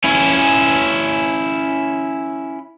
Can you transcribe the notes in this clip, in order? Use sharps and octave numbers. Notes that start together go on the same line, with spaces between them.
C#4 E4